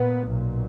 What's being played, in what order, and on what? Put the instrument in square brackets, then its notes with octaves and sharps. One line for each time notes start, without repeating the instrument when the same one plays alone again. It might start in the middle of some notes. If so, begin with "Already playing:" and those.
Already playing: [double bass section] A#2 B3
B1 A#2